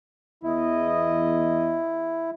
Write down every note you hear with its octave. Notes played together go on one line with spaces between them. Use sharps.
E2 E4 D#5